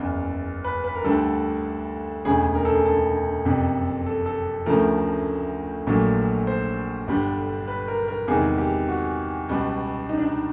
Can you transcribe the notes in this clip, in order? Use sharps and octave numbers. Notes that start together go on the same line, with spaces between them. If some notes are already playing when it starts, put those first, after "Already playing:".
Already playing: F#1 E2 C#3
B4
B4
A#4
D2 D3 G3 A4
E1 D2 C#3 G#4
A#4
A4
G#4
A4
F#1 F2 C3
A4
A4
D2 C#3 F3 A3 A#4
A#1 A#2 F#3 A3
C5
G1 G2 D3 G3
B4
A#4
A#4
E2 C3 D#3 G#3 G#4
G4
F#4
C#2 B2 G3
D#4
D4
D#4